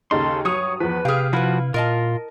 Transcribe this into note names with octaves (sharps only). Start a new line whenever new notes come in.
D#2 C#3 D#4 A4 C6
G2 F#3 C#5 D#6 F7
E2 F3 B4
C3 G4 G#4 F5 F6
F3 E4 F#4 B4
A#2 F4 A#4 D#5 A5